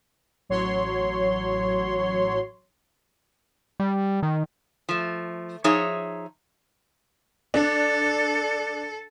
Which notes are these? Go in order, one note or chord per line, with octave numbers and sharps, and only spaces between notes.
A1 F#3 C#5 C6
G3
D#3
F3 A3
F3 D#4 G#4 C#5 E5
D4 A4